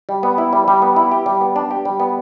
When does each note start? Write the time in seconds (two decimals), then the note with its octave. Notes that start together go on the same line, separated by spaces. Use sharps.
0.09 G3
0.23 B3
0.38 E4
0.53 G3
0.68 G3
0.82 B3
0.96 E4
1.12 G4
1.26 G3
1.41 B3
1.56 D4
1.71 G4
1.85 G3
2.00 B3